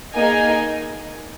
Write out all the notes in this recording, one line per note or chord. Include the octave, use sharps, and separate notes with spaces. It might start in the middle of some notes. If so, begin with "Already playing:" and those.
A#3 D#4 G#4 D#5 G#5